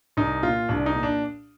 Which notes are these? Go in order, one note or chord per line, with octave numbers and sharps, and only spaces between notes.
C2 D#4
A#2 F4
C2 D4
D#4
A#2
D4